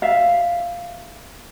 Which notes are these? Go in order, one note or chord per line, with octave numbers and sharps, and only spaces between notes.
E5 F5